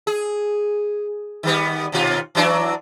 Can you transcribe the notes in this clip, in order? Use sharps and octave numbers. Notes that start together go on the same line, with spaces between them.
G#4
D#3 G3 B3
D#2 B2 F4
E3 F#3 D4